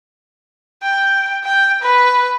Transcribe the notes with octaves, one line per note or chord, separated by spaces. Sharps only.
G5
G5
B4